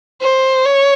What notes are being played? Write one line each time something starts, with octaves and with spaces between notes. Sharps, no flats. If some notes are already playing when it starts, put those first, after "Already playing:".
C5
C#5